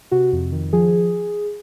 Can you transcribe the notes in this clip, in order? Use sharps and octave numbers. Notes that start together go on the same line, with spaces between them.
C3 F#4
F2
D#3
F3 G#4